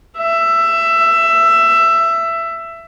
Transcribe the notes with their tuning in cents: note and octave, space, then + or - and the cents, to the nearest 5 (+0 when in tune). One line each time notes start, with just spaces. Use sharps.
E5 +15